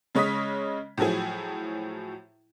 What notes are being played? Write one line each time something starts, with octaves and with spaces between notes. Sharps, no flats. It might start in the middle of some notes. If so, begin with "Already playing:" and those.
C#3 G#3 C#5 D#5 D#6 B6
A2 F3 F#3 E4 G#4